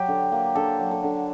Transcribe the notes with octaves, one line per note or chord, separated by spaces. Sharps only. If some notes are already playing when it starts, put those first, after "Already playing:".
Already playing: F#3 G4
D3
A#3
D3 A4
F#3
A4
D3